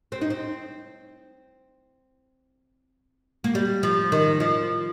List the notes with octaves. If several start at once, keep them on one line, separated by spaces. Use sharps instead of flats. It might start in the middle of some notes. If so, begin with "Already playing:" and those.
C4
D#4
C4
A#3
G3
F3
D#3
F3